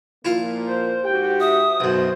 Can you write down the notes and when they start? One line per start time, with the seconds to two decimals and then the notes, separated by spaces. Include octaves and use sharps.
0.25 A#2 F3 A#3 E4 F4 F5
0.68 C5
1.05 G#2 F#4 G4 G5
1.40 E5 D#6
1.80 B1 F#2 B2 C5